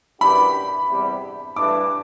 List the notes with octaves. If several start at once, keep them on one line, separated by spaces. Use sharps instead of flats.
F#2 E3 G3 D4 G4 B5
E2 C3 G3
G2 E3 A3 D4 D6